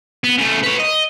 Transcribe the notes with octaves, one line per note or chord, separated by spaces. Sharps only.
B3
C#3 A3
B4 C#5
D#5